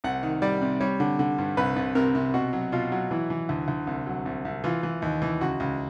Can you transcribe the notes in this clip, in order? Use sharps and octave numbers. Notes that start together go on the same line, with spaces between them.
C2 F#5
D#3
G3 D5
C3
G3 C#5
D3
D3
G2
C2 B4
C2
C3 A#4
C3
B2 F#4
F#3
B2 F4
F#3
E3 E4
E3
D2
D2
C2
F#3
C2
C2
E3 F4
E3
D#2
E3
C#2 F#4
C#2